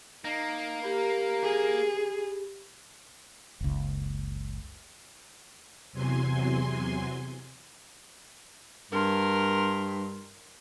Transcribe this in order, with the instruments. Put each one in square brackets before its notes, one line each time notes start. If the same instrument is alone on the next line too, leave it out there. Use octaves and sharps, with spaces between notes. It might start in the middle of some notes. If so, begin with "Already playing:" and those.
[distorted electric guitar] A#3 [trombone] D#4
[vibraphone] G4 B5 [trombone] A#4
[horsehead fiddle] G#4
[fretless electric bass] F#1 C#2
[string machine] E2 C3 F#3 G#5 C6
[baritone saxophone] G2 [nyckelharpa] A#4 C6